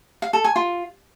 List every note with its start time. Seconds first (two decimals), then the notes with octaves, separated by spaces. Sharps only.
0.22 F5
0.33 A4
0.44 G#5
0.56 F4